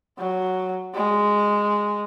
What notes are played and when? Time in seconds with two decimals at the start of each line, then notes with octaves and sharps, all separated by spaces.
0.18 F#3
0.94 G#3